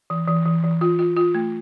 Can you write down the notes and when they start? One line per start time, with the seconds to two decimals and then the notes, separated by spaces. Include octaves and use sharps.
0.10 E3
0.28 E3
0.45 E3
0.64 E3
0.81 F4
0.99 F4
1.16 F4
1.35 A3